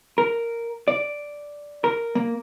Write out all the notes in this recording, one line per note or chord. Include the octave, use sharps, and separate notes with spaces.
A#4
D5
A#4
A#3